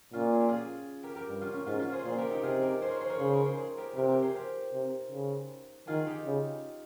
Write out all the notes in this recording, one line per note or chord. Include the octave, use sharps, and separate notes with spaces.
A#2 C#4 F4
G#4
G4
F4 G#4
G4 A#4
G4 A#4
G2
C#4 F4
C#4
G#2 C#4 F4
C#4 F4
G#4 C5
A#2 G#4 C5
G4 A#4
D#4 G4
C3 F4 G#4
G4 A#4
G#4 C5
A#4 C#5
G#4 C5
A#4 C#5
C#3 G#4 C5
A#4 C#5
G#4 C5
G#4 C5
G4 A#4
C3 G4 A#4
G4 A#4
G#4 C5
G4 A#4
C3
C#3
D#3 F4 G#4
D#4 G4
C#3